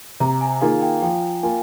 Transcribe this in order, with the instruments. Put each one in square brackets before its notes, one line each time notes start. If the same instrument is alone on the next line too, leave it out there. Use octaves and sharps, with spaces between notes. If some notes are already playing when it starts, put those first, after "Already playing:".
[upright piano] C3 [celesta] A#5
[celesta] G#5
[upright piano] D#3 A#3 F4 G#4 [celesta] F5
[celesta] G5
[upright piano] F3 [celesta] G5
[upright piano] A#3 F4 [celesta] G#5